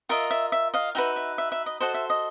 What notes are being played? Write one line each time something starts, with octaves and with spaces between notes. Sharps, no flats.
F4 A#4 D#5 E5
E5
E5
D#5 F5
D#4 F#4 B4 E5
E5
E5
E5
D#5
F#4 A4 C5 D#5
E5
D#5